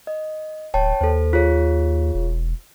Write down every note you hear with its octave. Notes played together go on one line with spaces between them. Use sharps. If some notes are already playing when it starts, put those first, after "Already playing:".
D#5
D1 C#5 G5 A5
D#2 A4 C5
F4 G#4 C#5
E1